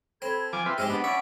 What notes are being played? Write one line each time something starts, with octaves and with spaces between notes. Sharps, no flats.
C4 A4 B5 G#6
F3 G#5 D6
C4 F4 B4 E5 G5 E6
G#2 G#3 C4 G4
B3 D4 F#5
C#4 D5 E5 B5